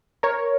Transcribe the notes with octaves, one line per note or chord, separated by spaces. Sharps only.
A#4 C#5